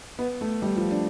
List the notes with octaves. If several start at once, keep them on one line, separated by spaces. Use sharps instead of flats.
B3
A3
G3
F3
D4